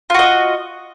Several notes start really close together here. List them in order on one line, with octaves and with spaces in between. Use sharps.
F4 F#4 D#5